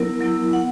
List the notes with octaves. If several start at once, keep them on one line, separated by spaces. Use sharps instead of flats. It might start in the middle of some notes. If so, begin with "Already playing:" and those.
Already playing: F#3 B3 E4 A#4
F#3 B3 E4
B3 F#5